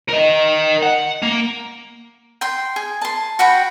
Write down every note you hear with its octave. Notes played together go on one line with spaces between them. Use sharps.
A#4 D#5
F#5
A#3
G5 C6
G#4
A5 C6
F#4 F#5 G5 B5